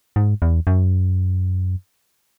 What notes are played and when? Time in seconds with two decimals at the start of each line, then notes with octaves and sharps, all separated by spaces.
0.16 G#2
0.42 E2
0.67 F#2